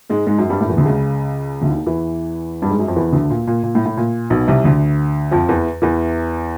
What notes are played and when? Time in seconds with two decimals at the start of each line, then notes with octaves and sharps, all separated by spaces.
0.10 G#2 G#3
0.27 G#2 G#3
0.38 F#2 F#3
0.50 G2 G3
0.61 A2 A3
0.69 E2 E3
0.77 D2 D3
0.86 C#2 C#3
1.61 D2 D3
1.69 D#2 D#3
1.86 E2 E3
2.62 G2 G3
2.70 G#2 G#3
2.79 F#2 F#3
2.87 F2 F3
2.96 E2 E3
3.12 D2 D3
3.30 A#2
3.47 A#2
3.63 A#2
3.75 A2
3.86 A2
3.97 A#2
4.30 B1 B2
4.48 C2 C3
4.64 D2 D3
5.31 F2 F3
5.49 E2 E3
5.82 E2 E3